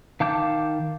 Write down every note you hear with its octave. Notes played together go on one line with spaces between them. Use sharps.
D#3 F5 A5 D6 G6